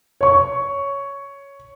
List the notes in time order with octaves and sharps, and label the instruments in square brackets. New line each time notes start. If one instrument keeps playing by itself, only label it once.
[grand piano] C#5 C#6